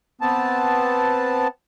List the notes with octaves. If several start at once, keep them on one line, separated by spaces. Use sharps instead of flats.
B3 C4 A5